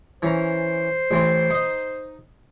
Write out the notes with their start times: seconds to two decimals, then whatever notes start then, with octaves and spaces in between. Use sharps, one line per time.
0.22 E3 C#4 C5 A#5
1.11 A1 E3 C4
1.50 D#4 D#5